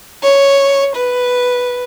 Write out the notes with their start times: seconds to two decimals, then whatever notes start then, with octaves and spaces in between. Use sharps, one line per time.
0.23 C#5
0.96 B4